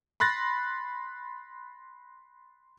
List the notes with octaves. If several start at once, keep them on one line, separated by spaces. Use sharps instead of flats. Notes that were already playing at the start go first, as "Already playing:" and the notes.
B5 C6 F#6 A6 A#6